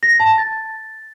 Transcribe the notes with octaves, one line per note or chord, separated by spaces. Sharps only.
A#6
A5
A6